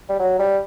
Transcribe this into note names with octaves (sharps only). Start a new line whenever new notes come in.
G3
F#3
G3